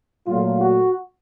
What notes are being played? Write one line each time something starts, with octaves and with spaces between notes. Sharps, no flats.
A#2 F#3 A3 F4
F#4